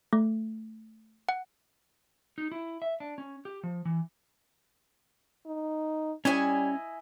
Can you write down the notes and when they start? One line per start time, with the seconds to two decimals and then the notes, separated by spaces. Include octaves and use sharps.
0.13 A3
1.29 F#5
2.38 D#4
2.52 E4
2.82 E5
3.00 D4
3.18 C#4
3.45 G4
3.63 F3
3.85 E3
5.47 D#4
6.25 G3 C#4 E4 D#5 G#5